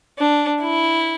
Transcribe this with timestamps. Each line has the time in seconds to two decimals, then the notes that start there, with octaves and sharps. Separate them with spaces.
0.18 D4
0.61 E4